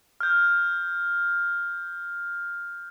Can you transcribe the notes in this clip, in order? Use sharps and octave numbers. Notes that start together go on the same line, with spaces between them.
F6 G6